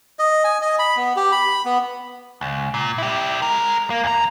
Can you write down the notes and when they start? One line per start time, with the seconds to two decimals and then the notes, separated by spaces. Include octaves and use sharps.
0.19 D#5
0.44 G#5
0.62 D#5
0.79 B5
0.97 B3
1.16 G4
1.32 B5
1.65 B3
2.41 C#2
2.74 A#2
2.98 E4 G4
3.42 G#3 A#4
3.90 A#3
4.04 E2 A#5